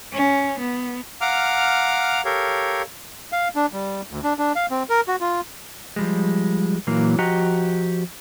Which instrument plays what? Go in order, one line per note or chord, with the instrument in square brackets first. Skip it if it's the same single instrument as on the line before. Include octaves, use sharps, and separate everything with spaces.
[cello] C#4
B3
[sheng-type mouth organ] F5 F#5 A#5 D6 F6
G4 A4 A#4 C#5 F5
[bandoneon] F5
D4
G3
D2
D4
D4
F5
C4
A#4
F#4
F4
[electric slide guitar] F3 G3 G#3
A#2 E3 F#3 A#3
F3 F#4 G4 D#5 A#5